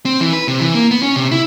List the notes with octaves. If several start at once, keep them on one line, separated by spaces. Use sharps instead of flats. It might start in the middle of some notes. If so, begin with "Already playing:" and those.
C4
E3
B4
C3
E3
A#3
B3
C#4
C3
E4